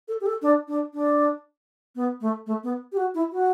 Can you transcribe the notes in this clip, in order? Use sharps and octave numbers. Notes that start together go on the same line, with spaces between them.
A4
G4
A4
D4
D4
D4
B3
A3
A3
B3
G4
F#4
E4
F#4